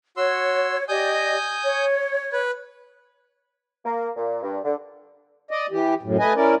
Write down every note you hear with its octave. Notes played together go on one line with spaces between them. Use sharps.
F#4 C#5 C6 E6
G4 D5 D#5 G#5 D#6 G6
C#5
B4
A#3
A#2
G2
D3
D5 D#5
E3 G4
F#2 A2
A3 B4 D#5 G#5
C#4 E4 A#4 D5